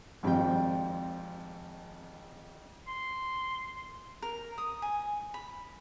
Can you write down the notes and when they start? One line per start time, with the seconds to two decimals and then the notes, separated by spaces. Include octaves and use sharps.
0.23 G#1 F2 G3 G5
2.87 C6
4.22 A#4
4.58 D#6
4.82 G#5
5.34 B5